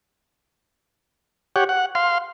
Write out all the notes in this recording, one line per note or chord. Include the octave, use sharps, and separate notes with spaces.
G4 C#5 F#5
F#5
F5 C6